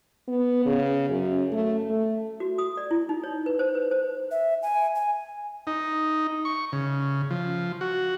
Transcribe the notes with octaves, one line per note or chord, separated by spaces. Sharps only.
B3
C#3
F#2
A3
A3
F#4
D#6
D5
E4
D#4
C#5
B4
C5
B4
C5
E5
G#5
G#5
D#4
C#6
C#3
F3
F#4